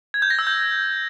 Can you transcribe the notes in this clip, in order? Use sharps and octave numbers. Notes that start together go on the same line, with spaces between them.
G#6
G6
A#6
E6
G6